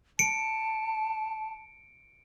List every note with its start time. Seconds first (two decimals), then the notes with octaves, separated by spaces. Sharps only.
0.19 A5 C#7 D7